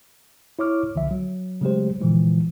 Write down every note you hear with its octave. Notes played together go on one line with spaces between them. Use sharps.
E4 C#5 C#6 D6 F6
C2 D3 F3 E5
F#3
C#3 F#3 G#3 A3 G4 C5
A#2 D3 E3 F3 G#3